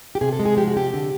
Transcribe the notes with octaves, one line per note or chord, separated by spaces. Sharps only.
G4
C3 G#4
A4
G#3
G#4
F3 G4
F#4
C3 G4
D3